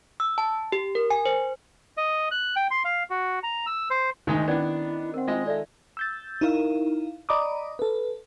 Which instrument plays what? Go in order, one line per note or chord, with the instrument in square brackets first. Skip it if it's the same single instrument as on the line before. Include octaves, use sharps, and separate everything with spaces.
[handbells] E6
A5
G4
A#4
G#5
C5
[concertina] D#5
F#6
G5
C6
F5
F#4
A#5
E6
C5
[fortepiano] D2 G#3 D#4 [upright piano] D#3
[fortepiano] B3 D4 [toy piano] C#4 D5 [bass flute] E4
[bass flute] C4 [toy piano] A#4 F#5
[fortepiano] G#3 D#5 [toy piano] F4
[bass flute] A4 [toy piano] D5 E5
[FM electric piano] E6 G6 A6
D#4 E4 A#4 F5
D5 D#5 A#5 B5 D6 D#6
A4 B4